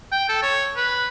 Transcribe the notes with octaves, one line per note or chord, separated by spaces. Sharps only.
G5
A4
C#5
B4